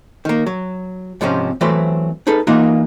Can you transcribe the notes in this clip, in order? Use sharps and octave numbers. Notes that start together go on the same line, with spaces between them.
D#3 A#3
F#3
G#2 C3 F3 C4 C#4
E3 F#3 A3 C4 B4 C5
D#4 G#4 A4 B4
E3 A#3 D#4 F4 F#4 A#4